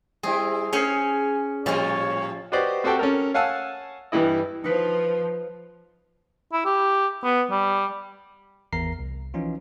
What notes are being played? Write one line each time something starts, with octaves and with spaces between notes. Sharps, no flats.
G3 C4 E4 G#4
C#4 G#4 C5 C#5 G#5
A2 F3 G3 F4 C#5
F#4 G4 B4 C5 D5 D#5
C4 F#4 G4 A4 G5
C#4 A4 A#4
C#5 F5 F#5 G#5 A5 E6
G2 E3 G3 E4 D#5
F3 D#4 B4
E4
G4
B3
G3
G#1 E2 A#4 A#5 C7
C2
E3 F3 C#4 D#4 F4